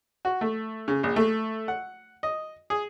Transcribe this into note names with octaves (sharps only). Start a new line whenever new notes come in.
F#4
A3
C#3
A#1
A3
F#5
D#5
G#4